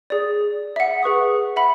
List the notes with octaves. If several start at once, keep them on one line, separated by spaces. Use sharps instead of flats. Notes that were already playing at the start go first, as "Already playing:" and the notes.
G#4 D5
E5 F#5
G#4 B4 C#6 D#6
E5 F#5 B5